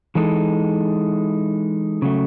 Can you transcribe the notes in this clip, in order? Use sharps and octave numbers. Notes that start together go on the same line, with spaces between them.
E3 G#3 D#4 A4
C#3 F#3 A3